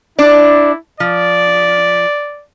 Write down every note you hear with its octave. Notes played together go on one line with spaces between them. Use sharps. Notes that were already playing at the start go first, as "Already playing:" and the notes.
D4 E4 D5
F3 D5